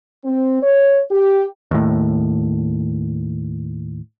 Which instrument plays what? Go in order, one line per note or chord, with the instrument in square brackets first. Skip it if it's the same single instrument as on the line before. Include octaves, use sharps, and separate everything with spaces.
[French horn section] C4
C#5
G4
[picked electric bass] D#2 A2